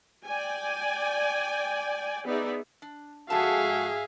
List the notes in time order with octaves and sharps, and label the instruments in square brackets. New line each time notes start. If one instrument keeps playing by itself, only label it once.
[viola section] D5 G5 G#5
B3 D#4 G#4 D5 E5
[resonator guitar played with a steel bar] D4
[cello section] G#2 G#4 [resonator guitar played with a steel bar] F3 A4 A5 [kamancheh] F#4 [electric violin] E5 F5